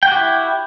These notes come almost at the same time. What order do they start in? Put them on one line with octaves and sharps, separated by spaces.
G5 F#4 G4 E4